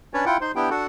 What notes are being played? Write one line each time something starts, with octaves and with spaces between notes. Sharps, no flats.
C#4 D4 B4 C#5 D5
E4 F4 F#5 G5
D#4 C5 C6
B3 D4 E4 G4 G5
D4 F#4 A4 F#5